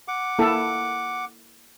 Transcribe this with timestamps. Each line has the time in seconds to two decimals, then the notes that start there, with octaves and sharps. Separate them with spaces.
0.08 F#5 D6
0.39 A#3 E4 A4